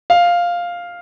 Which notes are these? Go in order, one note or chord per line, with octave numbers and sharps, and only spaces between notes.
F5